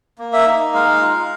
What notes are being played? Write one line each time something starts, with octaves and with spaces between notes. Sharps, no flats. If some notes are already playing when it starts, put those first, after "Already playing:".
A#3
E5
D#4
G#3 F5
F4